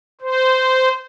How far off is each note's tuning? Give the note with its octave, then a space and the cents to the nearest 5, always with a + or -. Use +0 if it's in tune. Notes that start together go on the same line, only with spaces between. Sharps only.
C5 -15